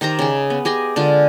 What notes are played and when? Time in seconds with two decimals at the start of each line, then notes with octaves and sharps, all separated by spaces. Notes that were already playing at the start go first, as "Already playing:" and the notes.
0.01 D#3 G4 C5 A#5
0.19 C#3 G#4
0.50 B3
0.65 G4 G#4 D#5 G#5
0.96 D3 G#3 F4